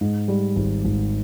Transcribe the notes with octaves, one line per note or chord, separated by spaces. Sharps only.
G#2
G3
G#1
G#1